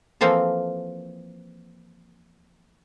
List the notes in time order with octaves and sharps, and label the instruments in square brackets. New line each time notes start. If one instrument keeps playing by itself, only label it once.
[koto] E3 F3 A#3 C4 F4 A4